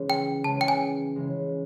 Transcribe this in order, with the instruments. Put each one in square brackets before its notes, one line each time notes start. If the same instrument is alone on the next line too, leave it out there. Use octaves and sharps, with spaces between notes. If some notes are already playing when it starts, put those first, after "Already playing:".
Already playing: [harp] C#3 E3 G#3
[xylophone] G5
[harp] C#3 E3 G#3 [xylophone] A5
[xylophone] G5
G#5
[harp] C#3 E3 G#3